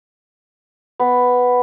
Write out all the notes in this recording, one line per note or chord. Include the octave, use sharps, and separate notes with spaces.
B3